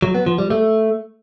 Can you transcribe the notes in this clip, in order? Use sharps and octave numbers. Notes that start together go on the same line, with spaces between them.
F#3
B3
F3
G3
A3